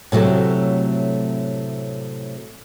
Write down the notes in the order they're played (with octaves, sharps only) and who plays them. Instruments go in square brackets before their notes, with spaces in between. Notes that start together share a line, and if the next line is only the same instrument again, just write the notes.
[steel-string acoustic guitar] A2 C3 F#3 A3